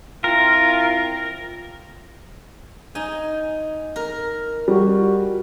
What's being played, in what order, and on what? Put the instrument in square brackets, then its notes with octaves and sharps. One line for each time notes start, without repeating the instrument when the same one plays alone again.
[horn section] C4 E4 F4 [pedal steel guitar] A#4
[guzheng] D#4 G#5
A#4
[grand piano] G3 [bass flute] F#4